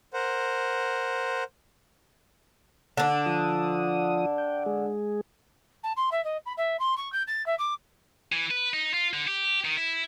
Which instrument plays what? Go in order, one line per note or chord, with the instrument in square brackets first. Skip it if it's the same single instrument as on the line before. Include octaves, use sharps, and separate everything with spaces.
[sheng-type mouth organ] A#4 C5 F#5
[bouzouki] D3 D4
[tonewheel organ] F3 F4 D#6
G5
G#3 G#4
[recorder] A5
C6
E5
D#5
B5
E5
C6
C#6
G6
A6
E5
D6
[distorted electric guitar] E3
B4
D#4
F4
D3
G4
D#3
E4